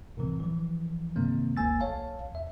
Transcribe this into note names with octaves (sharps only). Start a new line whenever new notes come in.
C2 A2 C3 E3 C4
E3 F3
G2 C3 D#3 G#3 A#3 C4
G1 D2 A#3 G#5 E6 A6
B1 C#5 F5 A5
E2 E5